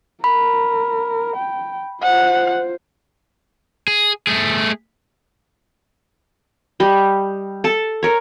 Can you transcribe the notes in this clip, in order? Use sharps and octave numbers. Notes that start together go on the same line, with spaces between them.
A#4 B5
G5
F4 C5 F#5
G#4
A3 G#4
G3 D#5
A4 A5
A#4 C#5